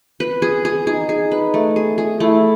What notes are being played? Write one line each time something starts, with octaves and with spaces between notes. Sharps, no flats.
B4
G#4
G#4
D#4 G#4
G#4
B4
A3
G#4
G#4
A3 E4